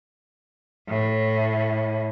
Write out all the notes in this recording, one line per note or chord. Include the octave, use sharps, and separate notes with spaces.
A2